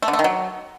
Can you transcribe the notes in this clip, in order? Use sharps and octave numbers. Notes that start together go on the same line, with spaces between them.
A3
D3
A3
D#3
F#3